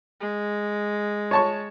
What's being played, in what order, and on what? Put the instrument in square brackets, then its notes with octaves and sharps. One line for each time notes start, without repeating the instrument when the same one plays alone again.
[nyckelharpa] G#3
[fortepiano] C#5 A5 C#6